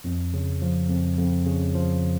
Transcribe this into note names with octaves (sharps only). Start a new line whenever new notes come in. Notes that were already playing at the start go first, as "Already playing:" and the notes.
F2
C#3
F3
F2
F2
C#3
F3